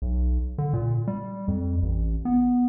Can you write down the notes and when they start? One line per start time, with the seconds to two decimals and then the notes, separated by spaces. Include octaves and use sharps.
0.02 B1
0.58 D3
0.73 A#2
1.07 G3
1.48 F2
1.83 A1
2.25 B3